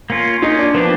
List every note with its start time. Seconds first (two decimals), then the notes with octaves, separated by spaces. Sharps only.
0.10 A#3 C#4 F4
0.42 A#3 C#4 D#4 F4
0.59 D4
0.74 F3 A#3 B3 D4 G4